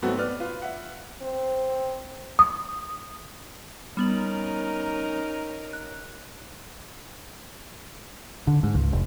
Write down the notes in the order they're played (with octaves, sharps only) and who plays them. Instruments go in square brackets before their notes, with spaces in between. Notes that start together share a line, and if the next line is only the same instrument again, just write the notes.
[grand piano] G#2 F#3 A3 B3 C4 F#4
B3 B4 D5 F6
F4 B4
E5 F#5
[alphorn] C4
[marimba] D#6
[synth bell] G3 B3 F#7 [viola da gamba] C#4 D#4 A#4
[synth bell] F#6
[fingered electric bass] D3
G#2
C#2
F1